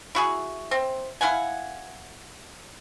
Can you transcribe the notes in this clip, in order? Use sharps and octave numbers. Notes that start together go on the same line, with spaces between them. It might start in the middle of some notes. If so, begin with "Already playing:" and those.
E4 F#4 G#4
C4
E4 F5 F#5 G#5